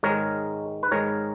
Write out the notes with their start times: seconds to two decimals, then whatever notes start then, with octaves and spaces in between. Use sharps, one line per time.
0.03 G#2 D#3 G#3 A#4 C#5
0.83 B4
0.91 G#2 D#3 G#3 A#4 C#5